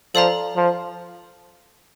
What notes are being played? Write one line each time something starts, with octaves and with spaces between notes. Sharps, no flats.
F3 A4 D5 F5 A#5
F3